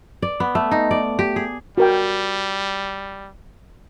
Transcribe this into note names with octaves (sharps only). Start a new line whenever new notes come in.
D5
B3
A3
D#4
D5
G4
G#4
G3 F#4 A#4 G5